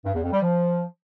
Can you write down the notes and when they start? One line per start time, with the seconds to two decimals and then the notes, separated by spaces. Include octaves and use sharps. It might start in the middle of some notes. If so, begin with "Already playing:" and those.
0.05 G2
0.14 E2
0.24 F2
0.33 G3
0.42 F3